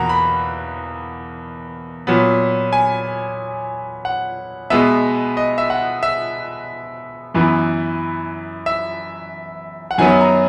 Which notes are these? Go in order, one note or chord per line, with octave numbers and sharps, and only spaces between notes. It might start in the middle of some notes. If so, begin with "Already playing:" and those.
Already playing: E2 B2 A#3 F#5 A#5
B5
A#2 F#3 B3
G#5
F#5
B2 G#3 B3 E5
D#5
E5
F#5
E5
F#2 E3 B3
E5
F#5
F#2 D#3 F#3 B3 G#5
A#5